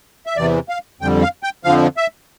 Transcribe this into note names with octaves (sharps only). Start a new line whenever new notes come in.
E5
E2 C3 E3 D5
F5
F2 D3 G3 G5
F5
G5
F2 D3 F3 F5
E5